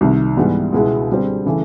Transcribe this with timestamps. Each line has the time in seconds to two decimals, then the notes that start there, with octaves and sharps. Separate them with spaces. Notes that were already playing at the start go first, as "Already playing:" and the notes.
0.01 C2 C3 D#3
0.37 G#2 E3 G3 B3
0.72 C#2 B2 G#3 B3 E4
1.09 D3 G3 C4
1.46 C#3 E3 A3